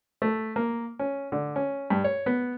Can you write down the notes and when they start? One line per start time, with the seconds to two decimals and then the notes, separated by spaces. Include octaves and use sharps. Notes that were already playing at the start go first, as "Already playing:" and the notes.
0.22 A3
0.56 A#3
0.99 C#4
1.32 D3
1.56 C#4
1.90 G2
2.04 C#5
2.26 B3